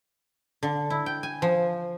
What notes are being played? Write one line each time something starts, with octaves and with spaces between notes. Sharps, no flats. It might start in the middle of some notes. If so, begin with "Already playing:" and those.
D3
E4
G5
G#5
F3